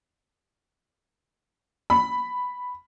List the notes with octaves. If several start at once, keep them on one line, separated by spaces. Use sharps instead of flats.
B5